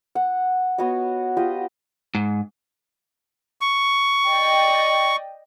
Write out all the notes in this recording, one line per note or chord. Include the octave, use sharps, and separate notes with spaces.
F#5
B3 F#4 C#5 D#5
F4 G4 D#5
G#2
C#6
D5 D#5 G5